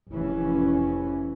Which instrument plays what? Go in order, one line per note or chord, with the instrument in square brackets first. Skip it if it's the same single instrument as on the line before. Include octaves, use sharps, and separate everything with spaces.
[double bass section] F1 E3 C#4